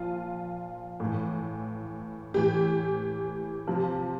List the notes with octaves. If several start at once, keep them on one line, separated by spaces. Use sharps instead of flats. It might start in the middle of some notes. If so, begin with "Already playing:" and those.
Already playing: A#2 F3 F4
A2
E3
A2 E3 G4
C3 F3